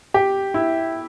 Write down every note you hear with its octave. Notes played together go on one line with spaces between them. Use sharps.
G4
E4